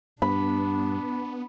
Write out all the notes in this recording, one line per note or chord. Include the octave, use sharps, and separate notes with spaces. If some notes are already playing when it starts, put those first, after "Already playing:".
G2 B3 D4 B5